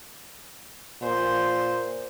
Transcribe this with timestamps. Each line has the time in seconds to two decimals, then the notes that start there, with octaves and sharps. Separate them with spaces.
1.02 A#2 C5